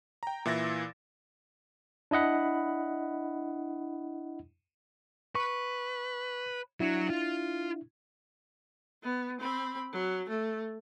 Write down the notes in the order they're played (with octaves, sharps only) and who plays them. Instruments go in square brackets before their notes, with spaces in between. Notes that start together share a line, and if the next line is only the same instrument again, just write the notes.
[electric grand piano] G5 A#5
A#2 E3 E4 E6 A6 A#6
[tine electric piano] D4 E4 D#5 F#5 B5
[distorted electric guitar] B4 [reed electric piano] C#6
[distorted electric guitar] F#3 [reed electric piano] D4 E4
[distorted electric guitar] F4
[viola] B3
C4 B5
F#3
A3